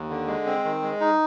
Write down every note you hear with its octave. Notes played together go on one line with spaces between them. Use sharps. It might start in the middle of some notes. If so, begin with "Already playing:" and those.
Already playing: D#2
D3
G#3
C4
D#3
G#3
D#4